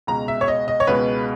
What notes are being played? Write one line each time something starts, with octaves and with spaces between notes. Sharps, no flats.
C#2 B2 G#3 A#5
E5
C#5
D#5
D#5
C#5
C#2 B2 G#3 B4